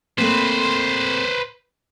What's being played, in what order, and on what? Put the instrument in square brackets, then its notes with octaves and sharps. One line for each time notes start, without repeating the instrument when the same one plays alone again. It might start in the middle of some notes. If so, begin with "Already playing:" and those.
[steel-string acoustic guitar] A3 A#3 C4 [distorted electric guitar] B4 C5